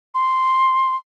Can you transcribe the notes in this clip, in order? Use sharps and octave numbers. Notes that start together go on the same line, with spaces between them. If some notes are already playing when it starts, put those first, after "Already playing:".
C6